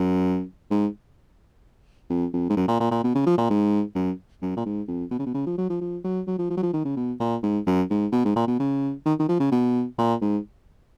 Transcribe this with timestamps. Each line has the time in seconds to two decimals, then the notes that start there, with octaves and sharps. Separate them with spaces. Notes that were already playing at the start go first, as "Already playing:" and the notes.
Already playing: F#2
0.71 G#2
2.10 F2
2.33 F2
2.50 G#2
2.57 F#2
2.68 A#2
2.80 A#2
2.91 A#2
3.04 B2
3.15 C#3
3.26 F3
3.38 A#2
3.50 G#2
3.95 F#2
4.42 F#2
4.57 A#2
4.66 G#2
4.88 F2
5.11 B2
5.19 C#3
5.26 B2
5.34 C#3
5.47 F3
5.58 F#3
5.70 F3
5.81 F3
6.04 F#3
6.27 F#3
6.39 F3
6.50 F3
6.57 F#3
6.63 F3
6.74 D#3
6.85 C#3
6.97 B2
7.20 A#2
7.43 G#2
7.66 F#2
7.90 G#2
8.12 B2
8.25 G#2
8.36 A#2
8.47 B2
8.60 C#3
9.06 D#3
9.19 D#3
9.29 F3
9.40 C#3
9.52 B2
9.98 A#2
10.22 G#2